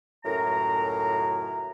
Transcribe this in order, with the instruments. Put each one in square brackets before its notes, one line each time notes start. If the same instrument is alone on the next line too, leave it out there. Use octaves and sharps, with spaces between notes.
[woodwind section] C#2 F#2 A2 A#4 A#5